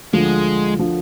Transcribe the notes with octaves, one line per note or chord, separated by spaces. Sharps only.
D2 D3 F3 G#3
D3 F3